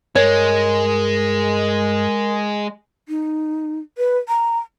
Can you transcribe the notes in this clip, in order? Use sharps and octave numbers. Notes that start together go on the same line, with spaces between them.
G2 G#3 A#4 C#5
D#4
B4
A#5